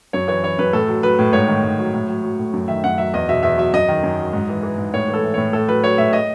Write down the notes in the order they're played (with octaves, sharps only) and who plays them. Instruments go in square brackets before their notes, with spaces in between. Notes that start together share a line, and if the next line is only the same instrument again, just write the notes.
[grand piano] F#2 C#5
E3 C#5
E3 C#5
F#2 B4
A2 A4
F#3
F#3 B4
A2
G#2 C#5
D#3
G#2
F#3
A2
F#3
F#3
A2
F#2
D#3 E5
F#2 F#5
F#3 E5
E2 D#5
B2 E5
E2 E5
F#3 E5
F#2 D#5
D#3
F#2
F#3
G#2
E3
E3
G#2
A2 C#5
E3
A4
E3
A2 C#5
A2 A4
F#3 B4
F#3 C#5
A2 E5
D#5